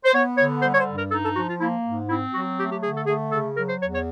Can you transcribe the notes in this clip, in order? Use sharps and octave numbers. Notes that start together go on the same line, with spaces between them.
C5
B3 C#5
D3 C#5
G3 C5
C#5
C5
G2
A#4
D#4 A4
A4
F3 F#4
F4
A#3 E4
G#2
C4 E4
F#3 F#4
A3 G4
G4
D3 G#4
A4
A3 G#4
C#3 A4
F#3 A#4
C5
E2 C#5
C#5